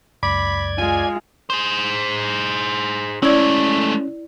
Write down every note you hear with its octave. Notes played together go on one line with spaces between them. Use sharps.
C#2 F#2 D5 B5 D6 G#6
G#3 F4 G#5
G#4 C5
G#3 A3 C#4 E4 D5 G#6